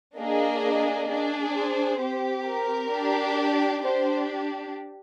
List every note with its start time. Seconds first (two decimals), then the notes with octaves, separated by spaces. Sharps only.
0.17 A#3 D4 G#4 D#5
1.08 D4 G#4
1.54 C5
2.00 C4 G4
2.45 A#4
2.91 D4 G4
3.82 D4 G4 C5